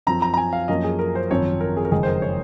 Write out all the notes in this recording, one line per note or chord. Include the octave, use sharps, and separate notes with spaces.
F#2 F3 C4 A#5
A#5
A#5
G#5
F5
F#2 F3 A#3 C#4 D#5
G#4
A#4
C5
G#1 F#2 F3 C4 C#5
A#4
G#4
A#4
F#1 F2 D#3 G#3 G#4
C5
A#4
C#5